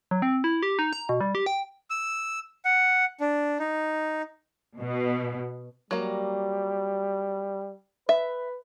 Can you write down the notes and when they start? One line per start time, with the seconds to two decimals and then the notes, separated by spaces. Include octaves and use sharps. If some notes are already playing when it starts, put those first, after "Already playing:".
0.11 F#3
0.22 C4
0.44 E4
0.63 G4
0.79 D#4
0.93 A#5
1.09 B2
1.21 G3
1.35 G4
1.46 G5
1.90 E6
2.65 F#5
3.20 D4
3.59 D#4
4.78 B2
5.91 F#3 G3 A#3
8.09 B4 E5